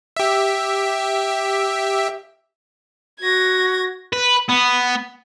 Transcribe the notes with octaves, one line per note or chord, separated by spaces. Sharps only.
G4 E5
F#4 G#6 A#6
B4
B3